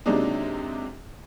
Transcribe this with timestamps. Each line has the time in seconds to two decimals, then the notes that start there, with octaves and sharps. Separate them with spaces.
0.06 C3 F#3 G#3 A#3 D4 D#4